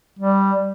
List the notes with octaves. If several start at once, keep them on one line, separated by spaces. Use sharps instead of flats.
G3